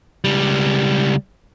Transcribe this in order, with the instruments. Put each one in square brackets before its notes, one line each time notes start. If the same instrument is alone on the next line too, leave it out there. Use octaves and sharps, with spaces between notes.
[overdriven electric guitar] C#2 G3